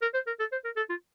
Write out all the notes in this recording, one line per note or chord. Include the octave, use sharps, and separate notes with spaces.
A#4
C5
A#4
A4
C5
A#4
A4
F4